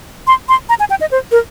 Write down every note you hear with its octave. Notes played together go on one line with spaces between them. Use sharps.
C6
C6
A#5
G#5
G5
D#5
C5
A#4